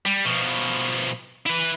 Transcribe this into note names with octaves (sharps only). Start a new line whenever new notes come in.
G3
B2 F3
E4 B4